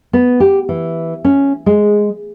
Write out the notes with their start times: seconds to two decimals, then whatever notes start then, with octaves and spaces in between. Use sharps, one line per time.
0.13 B3
0.40 G4
0.69 E3
1.24 C#4
1.66 G#3